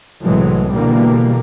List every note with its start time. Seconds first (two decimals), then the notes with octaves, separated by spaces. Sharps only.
0.23 C2 A2 E3 F#3 G#3
0.73 B2 D3 E3 G3 A#3